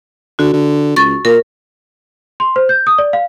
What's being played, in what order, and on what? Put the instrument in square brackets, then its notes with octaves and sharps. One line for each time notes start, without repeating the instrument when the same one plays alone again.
[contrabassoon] D3 [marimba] F#4
[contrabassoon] D3
[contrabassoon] C#2 [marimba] C#6 A6
[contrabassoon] A#2 [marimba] A#4
[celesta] C6
C5
G6
D#6
D5
F5